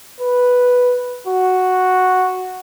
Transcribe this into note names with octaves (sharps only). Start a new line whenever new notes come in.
B4
F#4